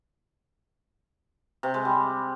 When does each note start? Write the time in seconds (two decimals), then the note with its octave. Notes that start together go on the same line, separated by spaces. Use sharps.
1.63 C3
1.74 G#3
1.85 G3